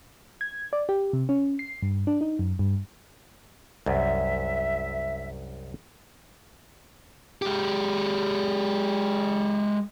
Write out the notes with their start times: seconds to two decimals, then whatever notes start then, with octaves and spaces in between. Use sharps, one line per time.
0.41 G#6
0.73 D5
0.89 G4
1.13 C3
1.29 C#4
1.59 C7
1.82 G2
2.07 D4
2.21 D#4
2.39 F#2
2.59 G2
3.86 C2 F#2 E5
7.42 G#3 G4